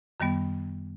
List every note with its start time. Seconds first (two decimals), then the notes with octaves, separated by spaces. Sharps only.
0.20 F#2 D#3 G3 B3